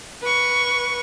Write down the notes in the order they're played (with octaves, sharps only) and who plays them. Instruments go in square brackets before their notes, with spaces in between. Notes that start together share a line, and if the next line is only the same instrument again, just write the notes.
[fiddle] B4 C#6